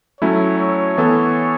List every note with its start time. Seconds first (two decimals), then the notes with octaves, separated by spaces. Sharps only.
0.21 F#3 A3 C#4 E4 C#5
0.59 C#5
0.97 E3 B3 A4